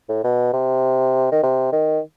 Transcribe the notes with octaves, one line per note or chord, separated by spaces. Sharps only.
A2
B2
C3
D#3
C3
D#3